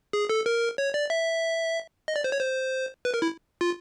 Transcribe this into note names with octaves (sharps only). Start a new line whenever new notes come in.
G#4
A4
A#4
C#5
D5
E5
D#5
D5
C5
C#5
C5
B4
A#4
E4
F4